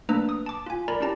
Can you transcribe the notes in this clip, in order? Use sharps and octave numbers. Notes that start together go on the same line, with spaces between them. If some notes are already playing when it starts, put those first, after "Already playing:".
A3 A#3 D4 B4 A#5 E6
D#6
A5 D6
F4 G#5
A#4 D5 A#5 B5
C#4 E4 G4 A5 A#5